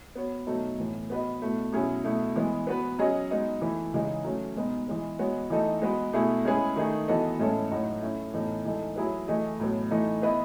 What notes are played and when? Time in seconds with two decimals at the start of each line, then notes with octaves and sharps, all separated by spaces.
0.15 B3 F#4 C#5
0.47 B2 F#3 A3 D#4 A4
0.78 A2 E3 B3
1.10 B3 F#4 B4 D#5
1.42 B2 A3 E4
1.72 B2 F#3 C#4 E4 G#4
2.04 B2 A3 E4
2.36 E3 G#3 B3
2.67 B3 F#4 B4
2.98 F#3 C#4 G#4 D#5
3.30 G#3 B3 D#4 F#4
3.61 E3 A3 E4 B4
3.93 C#3 E3 G#3 D#4 G#4
4.24 F#3 A3 C#4
4.56 B2 G#3 B3 D#4
4.87 E3 G#3 B3
5.19 G#3 B3 F#4 C#5
5.50 E3 A3 D#4 A4 D#5
5.82 G#3 B3 F#4 B4
6.13 B2 A3 E4 G#4
6.45 G#3 C#4 E4 G#4 B4
6.76 D#3 A3 D#4 G#4
7.08 E3 B3 F#4 A4 D#5
7.39 A2 G#3 C#4 E4 A4
7.71 A2 F#3 A3 D#4 F#4
8.02 A3 C#4 E4
8.34 A2 E3 B3 D#4 A4
8.65 E3 G#3 D#4 A4
8.96 F#3 A3 E4 G#4 B4
9.28 E3 A3 E4 G#4 D#5
9.60 A2 F#3 B3
9.91 E3 A3 D#4
10.22 B3 E4 B4 D#5